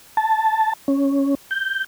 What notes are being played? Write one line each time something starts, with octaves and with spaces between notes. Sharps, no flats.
A5
C#4
G6